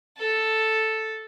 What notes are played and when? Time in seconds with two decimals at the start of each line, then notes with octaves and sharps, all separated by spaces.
0.18 A4